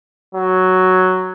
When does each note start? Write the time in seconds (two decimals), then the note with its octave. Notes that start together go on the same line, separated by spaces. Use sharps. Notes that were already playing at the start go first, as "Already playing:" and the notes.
0.35 F#3